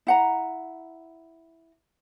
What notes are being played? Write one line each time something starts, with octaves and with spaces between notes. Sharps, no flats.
E4 F#5 A#5